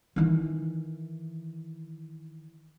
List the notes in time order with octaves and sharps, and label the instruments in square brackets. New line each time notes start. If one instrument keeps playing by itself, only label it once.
[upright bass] D#3 E3